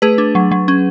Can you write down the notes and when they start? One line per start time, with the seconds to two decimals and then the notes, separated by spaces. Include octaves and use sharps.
0.02 A3 G#4 B4
0.18 D4
0.35 F#3
0.51 F#3
0.68 C#4